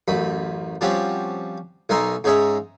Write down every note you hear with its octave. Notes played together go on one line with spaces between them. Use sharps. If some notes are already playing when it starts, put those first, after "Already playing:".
A1 F#2 B5
F3 G3 C4 C#4 F#4 G4
B1 D#4 A#4 E5 G#5 C6
G#2 C#4 G#4 C#5 E5 A#5